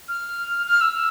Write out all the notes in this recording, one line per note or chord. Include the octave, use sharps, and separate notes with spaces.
F6
F6
E6
E6